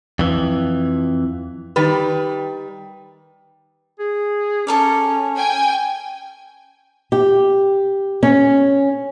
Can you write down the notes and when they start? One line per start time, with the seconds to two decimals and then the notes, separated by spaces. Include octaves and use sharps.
0.19 F2 E3
1.76 D#3 G3 B4
3.99 G#4
4.67 C#4 A4 A#4 D5
5.38 G5 G#5
7.12 G4
8.23 C#4